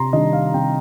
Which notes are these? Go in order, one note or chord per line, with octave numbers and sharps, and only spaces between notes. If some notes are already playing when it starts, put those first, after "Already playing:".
Already playing: C3 A#5 C6
D#3 G3 D4 D#5
F5
C3 G5